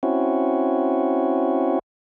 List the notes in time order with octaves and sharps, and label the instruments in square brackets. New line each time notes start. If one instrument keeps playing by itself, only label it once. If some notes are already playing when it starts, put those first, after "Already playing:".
[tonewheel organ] C4 C#4 E4 F#4